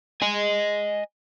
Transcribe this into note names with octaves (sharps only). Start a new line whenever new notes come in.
D#5 G#5